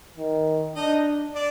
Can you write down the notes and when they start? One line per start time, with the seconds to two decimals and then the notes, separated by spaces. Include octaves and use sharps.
0.17 D#3
0.76 D4 D#4 D#5
1.34 D4 D5